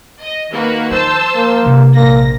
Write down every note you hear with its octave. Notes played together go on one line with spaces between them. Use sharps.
D#5
D#3 A#3 F#4 B4
F3 C5 A5 E6
A#3
C3 D4
A#1 A#3 A#6